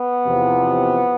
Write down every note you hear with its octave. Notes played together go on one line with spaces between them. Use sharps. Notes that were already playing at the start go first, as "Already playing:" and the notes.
Already playing: B3
E2 C3 F3